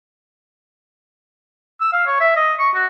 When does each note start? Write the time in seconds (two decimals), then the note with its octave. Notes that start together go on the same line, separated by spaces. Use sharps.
1.81 E6
1.93 F5
2.07 C#5
2.20 E5
2.36 D#5
2.59 C#6
2.75 F#4